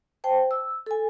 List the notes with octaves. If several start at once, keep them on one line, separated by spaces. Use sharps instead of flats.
C5 G5 A5
E6
A4 G#5